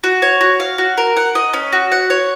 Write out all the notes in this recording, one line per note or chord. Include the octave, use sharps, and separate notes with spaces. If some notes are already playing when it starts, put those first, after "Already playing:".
F#4
C#5
F#4
F5
F#4
A#4
F#5
D#5
C#4
F#4
F#5
C#5